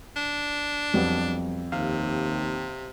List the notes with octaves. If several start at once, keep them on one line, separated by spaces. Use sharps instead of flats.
D4
F2 F#3 G3 B3
D#2 C3 F5